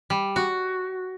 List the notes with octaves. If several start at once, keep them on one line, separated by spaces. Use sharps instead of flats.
G3
F#4